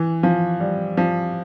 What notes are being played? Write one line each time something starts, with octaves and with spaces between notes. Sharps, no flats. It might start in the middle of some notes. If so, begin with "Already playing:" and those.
Already playing: E3
F3
G3
F3